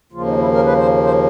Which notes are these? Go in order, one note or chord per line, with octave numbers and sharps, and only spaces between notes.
D#2 C#3 F3 A#3 F4
D#4
E4
A#4
B4
C5
C5